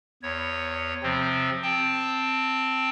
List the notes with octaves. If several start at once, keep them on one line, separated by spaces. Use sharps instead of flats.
E2 C#5
C3 F3 C4
C4 G5 A5